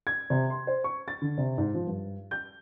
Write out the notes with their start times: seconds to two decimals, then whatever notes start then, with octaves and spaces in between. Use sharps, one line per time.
0.07 G#6
0.30 C3
0.50 C6
0.67 C5
0.84 C#6
1.08 A6
1.22 D3
1.38 C3
1.58 G#2
1.74 F3
1.87 G2
2.31 G6